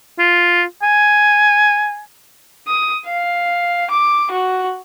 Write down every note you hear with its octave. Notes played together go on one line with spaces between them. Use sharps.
F4
G#5
D#6
F5
D6
F#4